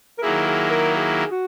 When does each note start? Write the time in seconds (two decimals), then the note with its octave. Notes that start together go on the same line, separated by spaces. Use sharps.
0.18 A#4
0.22 D#3 F#3 A#3 E4 G#4
0.47 G#4
0.71 A#4
0.95 G#4
1.31 F#4